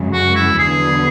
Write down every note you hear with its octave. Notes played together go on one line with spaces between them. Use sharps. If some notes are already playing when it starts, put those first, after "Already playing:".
Already playing: F#2 C#3 G#3
F#4
E4
E2 D3 F#3 B3 G#4